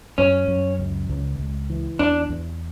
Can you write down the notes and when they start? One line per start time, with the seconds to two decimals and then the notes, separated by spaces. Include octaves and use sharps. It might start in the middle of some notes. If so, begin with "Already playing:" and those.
0.18 F#2 C#4
0.48 F#2
0.79 C#2
1.09 C#2
1.38 C#2
1.70 E3
1.99 E2 D4
2.30 E2